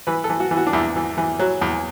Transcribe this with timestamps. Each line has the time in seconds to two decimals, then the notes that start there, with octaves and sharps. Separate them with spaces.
0.07 E3 B4
0.24 A4
0.29 E3
0.40 F#4
0.51 E3
0.57 F#4
0.67 D4
0.73 E2 E4
0.96 E3
1.18 E3
1.39 F#3
1.61 E2